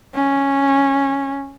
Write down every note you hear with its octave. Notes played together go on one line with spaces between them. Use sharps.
C#4